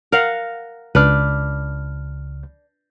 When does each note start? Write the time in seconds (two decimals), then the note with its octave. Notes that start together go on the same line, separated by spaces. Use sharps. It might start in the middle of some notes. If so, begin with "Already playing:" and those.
0.12 A#4 F5 F#5
0.95 C#2 D4 B4 F6